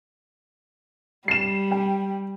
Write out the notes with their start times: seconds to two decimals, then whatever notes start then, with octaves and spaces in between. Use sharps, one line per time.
1.28 G3 C7 E7
1.71 G5